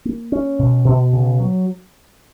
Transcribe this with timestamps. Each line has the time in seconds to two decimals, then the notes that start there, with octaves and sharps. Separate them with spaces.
0.05 A#3
0.32 C#4
0.59 B2
0.85 B2
1.13 C#3
1.40 F#3